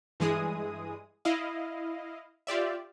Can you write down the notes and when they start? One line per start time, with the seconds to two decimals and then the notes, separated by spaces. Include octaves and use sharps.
0.20 G2 E3 G#3 G#4 D#6
1.25 E4 D#5 F5
2.47 F4 G4 D5 E5